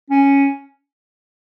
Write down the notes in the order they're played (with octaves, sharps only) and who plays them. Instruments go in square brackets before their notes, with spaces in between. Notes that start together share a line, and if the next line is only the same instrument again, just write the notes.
[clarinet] C#4